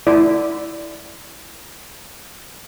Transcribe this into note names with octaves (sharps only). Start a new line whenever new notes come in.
E4 D5